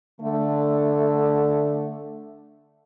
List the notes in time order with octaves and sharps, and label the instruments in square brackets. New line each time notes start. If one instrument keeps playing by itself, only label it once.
[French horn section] D3 A3